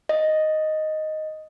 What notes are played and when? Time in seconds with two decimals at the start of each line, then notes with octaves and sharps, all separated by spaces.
0.09 D#5